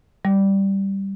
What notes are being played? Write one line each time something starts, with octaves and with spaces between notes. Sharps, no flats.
G3